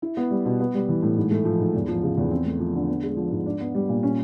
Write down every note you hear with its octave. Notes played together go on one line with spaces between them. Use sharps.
E4
B3
G3
B2
B3
G3
E3
A2
G#2
A3
F3
G#2
E2
F3
C#3
E2
C4
A3
F3
D3
B3
G#3
F3
G#2
D4
B3
G3
A#2
C#4